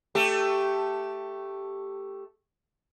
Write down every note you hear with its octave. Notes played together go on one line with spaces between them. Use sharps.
A3 G4